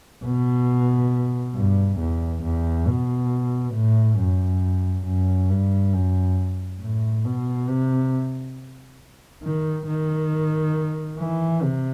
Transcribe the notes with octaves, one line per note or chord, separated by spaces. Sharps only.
B2
G2
E2
E2
B2
A2
F#2
F#2
G2
F#2
A2
B2
C3
D#3
D#3
E3
C3